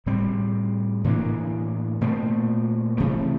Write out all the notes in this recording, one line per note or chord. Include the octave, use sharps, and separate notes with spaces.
A2 G3 C4
A2 E3 A#3 D4
A#2 A3 C4
C3 E3 A3